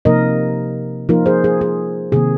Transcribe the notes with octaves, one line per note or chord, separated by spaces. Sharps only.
C3 F3 A#3 D#4 A#4 D#5
F3 A#3 D#4 F4 A#4
G#4 C5
G#4
G#4
C3 D#3 A#3 G#4